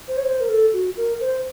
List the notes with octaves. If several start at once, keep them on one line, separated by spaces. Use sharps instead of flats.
C5
C#5
C5
A#4
A4
F#4
A#4
C5